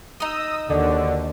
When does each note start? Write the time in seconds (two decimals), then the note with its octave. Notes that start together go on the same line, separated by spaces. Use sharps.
0.20 D#4 D#5 D#6 E6
0.69 D#2 D3 F#4 D5